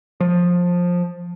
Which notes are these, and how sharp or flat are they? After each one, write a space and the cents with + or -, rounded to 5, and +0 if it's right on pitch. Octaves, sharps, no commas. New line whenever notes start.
F3 +15